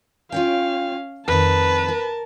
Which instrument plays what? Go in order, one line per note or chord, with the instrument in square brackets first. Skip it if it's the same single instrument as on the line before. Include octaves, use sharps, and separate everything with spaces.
[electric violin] C#4 F5 [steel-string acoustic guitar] F4 C#5 G5
[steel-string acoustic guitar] F2 D#3 [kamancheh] B4 [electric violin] A5
[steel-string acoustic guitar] A#4